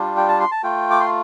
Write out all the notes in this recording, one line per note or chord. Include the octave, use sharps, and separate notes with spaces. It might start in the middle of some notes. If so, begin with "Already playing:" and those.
Already playing: G3 D4 F4
G5
A5
C6
A5
A3 F4 G5
D6
C6